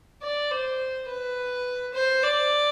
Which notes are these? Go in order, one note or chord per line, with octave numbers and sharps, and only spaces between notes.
D5
C5
B4
C5
D5